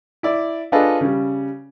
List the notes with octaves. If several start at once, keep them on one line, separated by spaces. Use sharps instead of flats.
E4 D5
D4 F4 G#4 A4 B4 D#5
C#3 G3